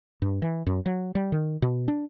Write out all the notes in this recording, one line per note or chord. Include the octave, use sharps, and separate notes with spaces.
G2
E3
F#2
F#3
G3
D#3
B2
D4